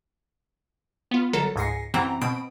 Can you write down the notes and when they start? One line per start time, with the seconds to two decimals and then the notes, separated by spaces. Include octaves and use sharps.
1.11 B3 F4
1.33 G1 F#3 A4 A#4 A#5
1.56 C#2 G#2 G#5 A#6 C7 C#7
1.94 F#2 C3 E3 C4 F#5 A#5
2.21 B2 C4 B5 D#6 D7